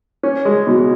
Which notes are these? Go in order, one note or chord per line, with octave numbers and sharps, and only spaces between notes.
C#4
G#3
B2